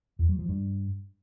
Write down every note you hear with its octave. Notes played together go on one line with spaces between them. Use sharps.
E2
F#3
F3
G2